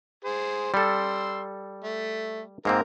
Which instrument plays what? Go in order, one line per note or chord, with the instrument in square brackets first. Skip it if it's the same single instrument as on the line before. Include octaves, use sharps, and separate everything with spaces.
[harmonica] G#4 C5
[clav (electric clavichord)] G3 A4 [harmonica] C6 E6
[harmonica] A3
[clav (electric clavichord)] G#2 A#3 C4 [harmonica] A#4